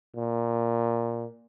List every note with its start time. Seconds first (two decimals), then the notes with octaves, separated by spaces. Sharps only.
0.16 A#2